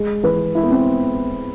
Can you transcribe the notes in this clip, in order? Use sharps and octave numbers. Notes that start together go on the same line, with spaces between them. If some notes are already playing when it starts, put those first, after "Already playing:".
Already playing: G#3
E3 B4
G#3 E4
B3
C4